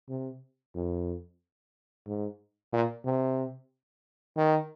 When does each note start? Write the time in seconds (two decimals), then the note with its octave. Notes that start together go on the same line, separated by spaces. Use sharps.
0.09 C3
0.75 F2
2.07 G#2
2.73 A#2
3.05 C3
4.37 D#3